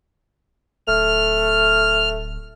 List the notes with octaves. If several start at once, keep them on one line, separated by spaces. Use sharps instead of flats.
D1 A3 F6